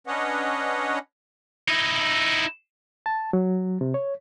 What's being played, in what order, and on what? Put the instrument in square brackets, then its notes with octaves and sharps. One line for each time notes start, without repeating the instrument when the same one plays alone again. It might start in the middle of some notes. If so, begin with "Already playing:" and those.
[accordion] C#4 D4 B4 C#5 D#5 F#5
[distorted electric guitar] D#4 E4
[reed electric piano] A5
F#3
C3
C#5